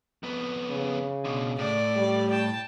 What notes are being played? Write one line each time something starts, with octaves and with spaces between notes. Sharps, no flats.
F2 B3
C#3
B2 D3
A2 D5
G3
G5 A5